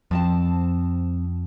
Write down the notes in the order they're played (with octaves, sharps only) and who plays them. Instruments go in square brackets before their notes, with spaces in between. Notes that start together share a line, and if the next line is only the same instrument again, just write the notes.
[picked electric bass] F2 [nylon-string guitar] F3 C4 A5